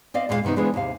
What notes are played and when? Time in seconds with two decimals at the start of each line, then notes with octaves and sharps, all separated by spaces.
0.14 C4 D5 D#5 F5
0.29 D#2 A#2 G#3 F4 F5
0.44 G2 C3 D#3 B3 D#4
0.56 C#3 E3 F3 G#3 B3 D4
0.74 D#2 G#2 C3 F5